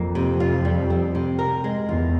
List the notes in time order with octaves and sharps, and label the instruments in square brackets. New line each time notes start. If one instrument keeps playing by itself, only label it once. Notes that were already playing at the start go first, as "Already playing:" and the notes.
Already playing: [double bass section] F2 [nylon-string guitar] A#3
[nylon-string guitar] C3
F4
G3
C4
C3
A#4
G#3
[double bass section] E2 [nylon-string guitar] F4